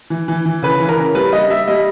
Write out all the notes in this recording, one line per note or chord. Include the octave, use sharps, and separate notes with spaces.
E3
E3
E3
C#3 B4
E3
A#4
C#3
G3 B4
G3 D#5
G3 E5
G3 D#5